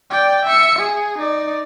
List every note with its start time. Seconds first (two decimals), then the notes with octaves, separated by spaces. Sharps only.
0.10 D5 G5
0.45 E5 C#7
0.79 G#4
1.18 D#4 D5